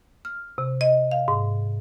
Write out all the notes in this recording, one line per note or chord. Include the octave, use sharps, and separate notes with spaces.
F6
C3
D#5
F5
G#2